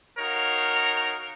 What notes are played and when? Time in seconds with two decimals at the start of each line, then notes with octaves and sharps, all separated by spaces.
0.18 D#4 F#4 A#4 C#5 F5